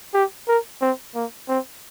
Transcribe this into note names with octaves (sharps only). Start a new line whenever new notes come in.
G4
A#4
C4
A#3
C4